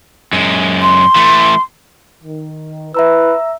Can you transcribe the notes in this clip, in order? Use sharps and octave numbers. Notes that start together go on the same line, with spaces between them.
F#2 G#3
C6
E3 A3
D#3
E4 B4 E5 A#5 E6